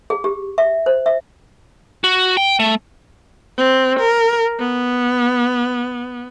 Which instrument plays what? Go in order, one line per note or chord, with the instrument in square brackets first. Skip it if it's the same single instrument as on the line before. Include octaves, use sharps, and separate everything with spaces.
[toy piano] G#4
G4
E5
C5
E5
[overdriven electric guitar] F#4
G5
A3
[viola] C4
A#4
B3